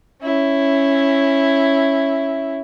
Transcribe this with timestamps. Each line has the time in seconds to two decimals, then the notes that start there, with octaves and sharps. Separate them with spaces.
0.21 C#4 E4